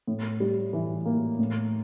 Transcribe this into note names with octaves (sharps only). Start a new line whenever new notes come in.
A2
G3
E3
A#3
A2